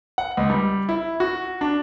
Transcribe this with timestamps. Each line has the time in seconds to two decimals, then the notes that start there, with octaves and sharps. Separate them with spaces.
0.18 F#5
0.37 C#2
0.50 G3
0.89 E4
1.20 F#4
1.61 D4